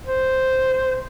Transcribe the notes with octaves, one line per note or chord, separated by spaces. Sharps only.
C5